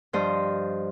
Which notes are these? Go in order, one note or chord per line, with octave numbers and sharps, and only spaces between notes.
G2 F3 C5 D#5